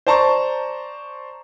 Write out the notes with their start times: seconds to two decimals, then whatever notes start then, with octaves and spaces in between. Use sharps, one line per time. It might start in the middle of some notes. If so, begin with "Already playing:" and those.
0.07 C5 D5 A5 A#5 C6 C#6